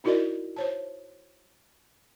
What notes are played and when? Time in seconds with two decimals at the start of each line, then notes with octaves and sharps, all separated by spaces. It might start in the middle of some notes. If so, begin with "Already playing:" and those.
0.04 D#4 E4 F#4 A#4 D5 D#5
0.56 C5 C#5 A5